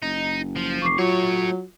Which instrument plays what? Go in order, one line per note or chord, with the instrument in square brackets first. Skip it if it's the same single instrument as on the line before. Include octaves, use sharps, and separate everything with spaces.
[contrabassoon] F#1 [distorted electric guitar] D#4
[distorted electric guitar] F3
[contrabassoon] F1 [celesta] C#6 D6 C7
[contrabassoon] F#3 [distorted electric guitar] A3 C#5 [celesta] F4